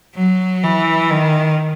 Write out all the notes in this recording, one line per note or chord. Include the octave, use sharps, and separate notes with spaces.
F#3
E3
D#3